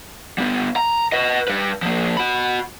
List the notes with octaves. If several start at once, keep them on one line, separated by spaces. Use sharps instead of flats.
G3 B3
A#5
B4 D#5
G3 B4
F3 A#3
F#4 B5